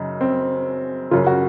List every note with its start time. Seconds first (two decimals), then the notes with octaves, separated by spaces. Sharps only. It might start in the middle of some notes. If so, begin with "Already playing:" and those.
Already playing: F#2 C#3 D#4
0.21 C4
1.11 F#2 C#3 F4
1.27 F#4